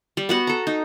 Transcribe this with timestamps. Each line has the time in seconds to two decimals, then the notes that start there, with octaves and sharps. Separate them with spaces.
0.17 G3
0.29 B3 F#4 F#5
0.47 A4 A#5
0.67 D#4